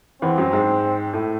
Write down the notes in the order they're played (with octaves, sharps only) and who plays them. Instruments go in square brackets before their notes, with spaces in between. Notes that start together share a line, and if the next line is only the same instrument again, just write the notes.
[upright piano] E2 E3 [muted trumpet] C4
[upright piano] F#2 F#3
G#2 G#3
A2 A3